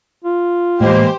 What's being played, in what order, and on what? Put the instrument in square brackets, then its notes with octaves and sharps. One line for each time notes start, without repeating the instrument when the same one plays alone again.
[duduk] F4
[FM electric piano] A2 [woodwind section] E3 G#3 A#3 [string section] G4 C5